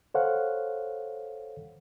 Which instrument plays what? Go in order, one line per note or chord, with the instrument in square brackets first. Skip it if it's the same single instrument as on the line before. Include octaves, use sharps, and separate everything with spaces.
[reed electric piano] A4 C5 C#5 F5 F#5